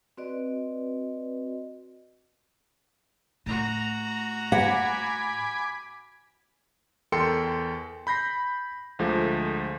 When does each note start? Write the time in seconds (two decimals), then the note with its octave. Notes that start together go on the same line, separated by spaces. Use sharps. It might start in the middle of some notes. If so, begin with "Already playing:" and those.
0.17 C4 F#4 B4 D5 D#5
3.46 A2 F#4 A#5
4.52 F#5 G#5 B5 D6
7.12 E2 A4 A#4 G5 C6 C#7
8.07 B5 G6 A#6 C7
8.99 D2 F3 G#3 A3